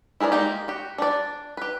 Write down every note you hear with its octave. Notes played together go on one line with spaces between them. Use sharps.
E4 G#4 A#4 B4 D5
G#3 A#3 D#4 G4
F#4 G4
D4 D5
G4 B4